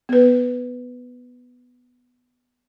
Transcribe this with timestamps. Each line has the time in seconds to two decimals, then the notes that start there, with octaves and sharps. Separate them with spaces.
0.09 B3 B4